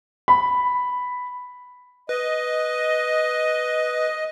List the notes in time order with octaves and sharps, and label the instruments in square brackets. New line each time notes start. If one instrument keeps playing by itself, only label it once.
[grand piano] B5
[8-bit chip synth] B4 [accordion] D#5